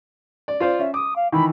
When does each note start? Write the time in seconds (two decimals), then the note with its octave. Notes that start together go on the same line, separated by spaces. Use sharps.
0.48 D5
0.60 F4 C5 D5
0.79 C#4 E5
0.94 D6 D#6
1.15 F5
1.32 D#3 E3 B5